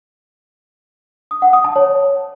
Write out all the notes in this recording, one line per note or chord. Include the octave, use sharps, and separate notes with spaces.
D#6
F#5
D#6
A5
C#5